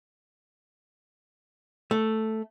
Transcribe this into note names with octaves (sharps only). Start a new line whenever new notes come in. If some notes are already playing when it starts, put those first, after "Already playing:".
A3